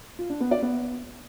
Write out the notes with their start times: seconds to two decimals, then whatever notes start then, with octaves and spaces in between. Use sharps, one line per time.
0.19 F4
0.30 D4
0.40 B3
0.51 D5
0.62 B3